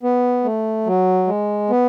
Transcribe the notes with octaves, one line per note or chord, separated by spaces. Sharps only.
B3
A3
F#3
G#3
B3